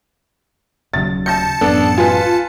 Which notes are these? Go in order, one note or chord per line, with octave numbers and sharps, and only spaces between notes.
D#1 C#3 F#3 A6
A5 G6 A#6 C#7
A1 F#2 B3 D4 A4
F4 B4 G#5